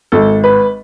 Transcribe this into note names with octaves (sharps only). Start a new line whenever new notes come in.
G#1 A4
B4